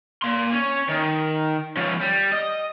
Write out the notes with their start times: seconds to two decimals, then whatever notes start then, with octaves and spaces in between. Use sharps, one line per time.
0.22 A#3 C6
0.52 C#4
0.89 D#3
1.77 F3 C#4
2.01 G3
2.32 D#5